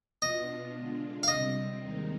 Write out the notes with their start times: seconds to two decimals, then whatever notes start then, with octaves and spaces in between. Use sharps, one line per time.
0.22 B2 B3 D4 F4 D#5
0.75 D3 G#3 D4 F4
1.23 F5
1.28 C3 G3 C4 D#5
1.80 D#2 D#3 G#3 C4 D#4